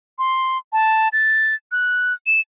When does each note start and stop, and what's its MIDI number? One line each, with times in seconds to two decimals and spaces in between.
0.19 0.58 84
0.73 1.09 81
1.13 1.55 93
1.72 2.14 90
2.27 2.40 100